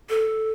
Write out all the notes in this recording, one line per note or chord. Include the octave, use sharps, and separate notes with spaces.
A4